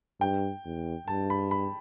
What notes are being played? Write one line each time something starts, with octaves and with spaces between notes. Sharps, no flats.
G2 G5
E2
G2 A5
B5
B5